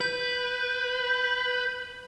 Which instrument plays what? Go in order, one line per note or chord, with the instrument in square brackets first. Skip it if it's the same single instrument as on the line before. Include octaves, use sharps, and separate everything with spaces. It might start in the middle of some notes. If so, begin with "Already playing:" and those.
[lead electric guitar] B4 [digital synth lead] G6